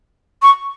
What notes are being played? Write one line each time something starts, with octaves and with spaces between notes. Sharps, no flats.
C#6